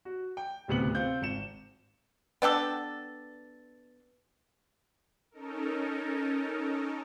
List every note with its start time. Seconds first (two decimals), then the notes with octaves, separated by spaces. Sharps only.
0.05 F#4
0.37 G5
0.68 D1 D2 C3 B3 C#7 F#7
0.95 C4 F4 G6
1.22 G#1 C#7 E7
2.42 B3 D4 G4 A4
5.31 C#4 D#4 A4 A#4